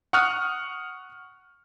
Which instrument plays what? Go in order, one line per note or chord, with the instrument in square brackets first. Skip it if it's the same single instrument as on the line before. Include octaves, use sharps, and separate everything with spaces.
[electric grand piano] F#5 C#6 D#6 F6 F#6